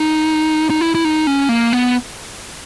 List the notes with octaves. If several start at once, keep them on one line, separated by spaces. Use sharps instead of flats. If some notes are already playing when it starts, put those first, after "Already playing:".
Already playing: D#4
D#4
E4
E4
D#4
C#4
A#3
B3